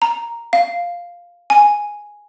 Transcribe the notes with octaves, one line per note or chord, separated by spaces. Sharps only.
A#5
F5
G#5